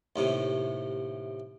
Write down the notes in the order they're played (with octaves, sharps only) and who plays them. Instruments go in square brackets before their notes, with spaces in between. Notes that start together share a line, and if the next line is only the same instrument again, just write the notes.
[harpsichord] D#2 A2 C3